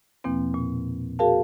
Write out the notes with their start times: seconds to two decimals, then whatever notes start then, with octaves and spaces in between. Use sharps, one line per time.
0.24 E2 B2 F3 A#3 C4
0.54 A#2
1.19 F#4 G#4 A#4 F5 A5